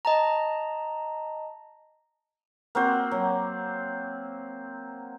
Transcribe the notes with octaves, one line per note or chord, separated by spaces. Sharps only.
D#5 A5 A#5
A#3 C4 F#4 C5
F#3